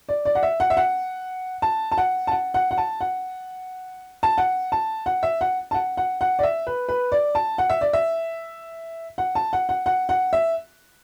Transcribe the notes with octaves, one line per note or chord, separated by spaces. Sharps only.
D5
D5
F#5
E5
F#5
E5
F#5
A5
A5
F#5
A5
F#5
F#5
F#5
A5
F#5
A5
F#5
A5
F#5
E5
F#5
A5
F#5
F#5
F#5
D5
E5
B4
B4
D5
A5
F#5
E5
D5
E5
F#5
A5
F#5
F#5
F#5
F#5
E5